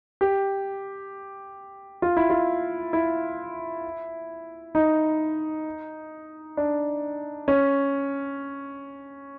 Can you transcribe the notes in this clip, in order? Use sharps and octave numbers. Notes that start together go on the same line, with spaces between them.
G4
F4
E4
F4
E4
D#4
D4
C#4